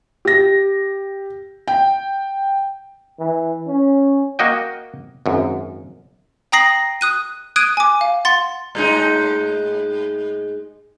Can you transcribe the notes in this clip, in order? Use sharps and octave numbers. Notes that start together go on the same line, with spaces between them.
G4 A#6
G5
E3
C#4
A#3 F#4 D#5 G5
G#1 F#2
G5 A#5 D#6 A#6 C7 F#7
D#6 F#6 D#7
D#6 F#6 G#6 D7 D#7
G#5 D6
F5
F#5 C6 A6
A2 G#3 D#4